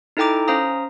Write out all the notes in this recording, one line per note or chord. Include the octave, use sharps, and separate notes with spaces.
D#4 E4 A4 G5 A#5 D6
C#4 C5 F5 A#5 D#6